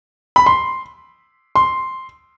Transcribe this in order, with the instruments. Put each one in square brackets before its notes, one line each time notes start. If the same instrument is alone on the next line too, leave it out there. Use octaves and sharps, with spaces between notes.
[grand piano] B5
C6
C6